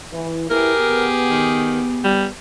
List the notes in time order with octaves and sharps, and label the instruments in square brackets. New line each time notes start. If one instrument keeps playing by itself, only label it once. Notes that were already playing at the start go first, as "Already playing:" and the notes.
[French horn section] E3
[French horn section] E4 B4 [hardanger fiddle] G4 G#4 [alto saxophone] A#4
[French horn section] B3
[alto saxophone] D#3
G3